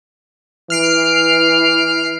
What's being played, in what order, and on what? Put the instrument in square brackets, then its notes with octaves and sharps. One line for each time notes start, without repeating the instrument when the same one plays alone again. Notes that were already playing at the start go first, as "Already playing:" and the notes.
[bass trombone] E3 [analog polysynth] F6 C7 D7